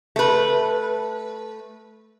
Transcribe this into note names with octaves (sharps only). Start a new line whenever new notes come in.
A3 B4